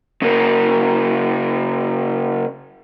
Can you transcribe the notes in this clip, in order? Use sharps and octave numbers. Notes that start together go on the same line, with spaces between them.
C#3 A#3